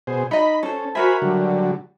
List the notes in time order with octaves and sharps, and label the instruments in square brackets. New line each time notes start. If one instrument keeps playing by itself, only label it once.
[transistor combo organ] B2 G#4 C5
[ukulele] D#4 D#5 [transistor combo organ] B5
[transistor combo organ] C#4 [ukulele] A4 C5
[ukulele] F#4 A#4 E5 [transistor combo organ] C5 G#5 B5
[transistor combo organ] D3 F#3 G3